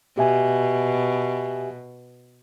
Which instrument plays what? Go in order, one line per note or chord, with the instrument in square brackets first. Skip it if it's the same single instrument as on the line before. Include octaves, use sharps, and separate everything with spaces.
[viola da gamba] B2 [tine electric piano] G4 E5 G#5